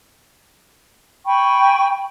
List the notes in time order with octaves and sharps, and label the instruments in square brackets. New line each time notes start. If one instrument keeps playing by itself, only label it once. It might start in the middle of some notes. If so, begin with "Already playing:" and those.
[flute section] G5 G#5 B5 C#6